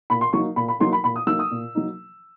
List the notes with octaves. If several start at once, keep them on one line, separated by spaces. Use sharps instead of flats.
A#2 B5
C6
F#3 A#3 D#4 C#6
A#2 B5
B5
F#3 A#3 D#4 C6
B5
A#2 B5
D#6
F#3 A#3 D#4 E6
D#6
A#2
F#3 A#3 D#4